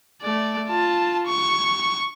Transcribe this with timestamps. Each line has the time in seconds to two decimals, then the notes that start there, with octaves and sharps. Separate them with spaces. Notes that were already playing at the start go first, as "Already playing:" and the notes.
0.22 A3 D5
0.69 F4 A5
1.27 C#6